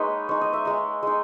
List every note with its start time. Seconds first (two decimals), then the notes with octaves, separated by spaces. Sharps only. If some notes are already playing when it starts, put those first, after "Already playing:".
Already playing: G#3 A#3 D#4 B4 C#5
0.29 G#3 D#4 C#5
0.41 D#5
0.53 E5
0.65 G#3 D#4
1.03 G#3 D#4